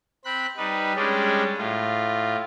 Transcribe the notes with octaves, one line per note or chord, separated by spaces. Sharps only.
C4 B5 F#6
G3 D#4 B4
G3 G#3 C#4 D4
A2 F4